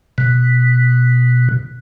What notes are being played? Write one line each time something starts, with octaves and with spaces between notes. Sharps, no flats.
B2